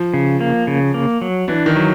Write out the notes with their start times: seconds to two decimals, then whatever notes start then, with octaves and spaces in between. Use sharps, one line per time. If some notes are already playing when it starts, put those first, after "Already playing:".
Already playing: F3
0.14 C#3
0.41 A#3
0.67 C#3
0.94 A#3
1.21 F#3
1.48 E3 D4
1.66 D#3
1.76 F#3